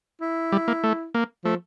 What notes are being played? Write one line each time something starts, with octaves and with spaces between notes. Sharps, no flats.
E4
G3
A#3
A3
A#3
F3 A3